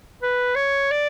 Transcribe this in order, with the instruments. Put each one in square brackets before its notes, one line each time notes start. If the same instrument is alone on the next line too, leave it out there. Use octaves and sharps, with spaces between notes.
[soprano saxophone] B4
C#5
D5